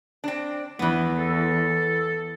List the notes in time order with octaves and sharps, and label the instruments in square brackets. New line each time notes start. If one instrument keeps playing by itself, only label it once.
[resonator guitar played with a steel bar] C4 D4
[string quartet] E2 [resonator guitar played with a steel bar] E3 B3
[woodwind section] A4